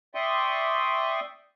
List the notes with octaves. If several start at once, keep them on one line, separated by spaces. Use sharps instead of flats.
D5 E5 G5 C6 C#6 D#6